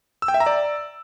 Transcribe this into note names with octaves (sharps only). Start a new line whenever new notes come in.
E6
G5
E5
A#5
D5